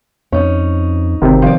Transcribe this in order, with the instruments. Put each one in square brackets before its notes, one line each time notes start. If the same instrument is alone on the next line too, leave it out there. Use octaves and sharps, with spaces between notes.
[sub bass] F2 [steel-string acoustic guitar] C#4 D#4
[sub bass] G1 [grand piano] C3 D#3
[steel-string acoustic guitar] F3 D5